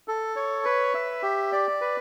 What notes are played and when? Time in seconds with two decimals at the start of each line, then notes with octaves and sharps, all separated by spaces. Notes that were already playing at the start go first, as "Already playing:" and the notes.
0.08 A4
0.36 C#5
0.65 B4
0.94 E5
1.23 G4
1.52 D5
1.81 B4